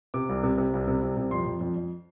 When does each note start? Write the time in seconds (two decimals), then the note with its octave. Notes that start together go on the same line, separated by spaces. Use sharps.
0.14 C3 D6
0.29 C2
0.43 C3
0.58 C3
0.73 C2
0.88 C3
1.02 C2
1.17 C3
1.31 F2 C6
1.46 F2
1.61 F2
1.76 F2